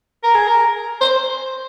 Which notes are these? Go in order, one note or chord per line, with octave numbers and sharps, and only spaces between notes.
A#4
G#4
A#4
C5